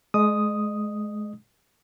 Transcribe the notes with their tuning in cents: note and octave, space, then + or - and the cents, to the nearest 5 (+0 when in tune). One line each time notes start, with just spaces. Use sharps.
G#3 +30 D#5 -35 D#6 +0